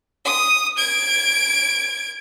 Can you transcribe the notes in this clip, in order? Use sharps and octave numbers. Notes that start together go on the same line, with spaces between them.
D#6
G#6 D7